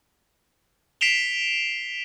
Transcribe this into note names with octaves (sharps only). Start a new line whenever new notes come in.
B6 C7 D7 E7 F7 G7